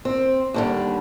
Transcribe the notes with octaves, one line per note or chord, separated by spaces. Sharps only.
C4
D#2 D3 G3